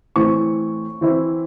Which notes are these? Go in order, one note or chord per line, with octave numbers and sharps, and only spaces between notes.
A2 E3 C4 C#6
E3 C4 E4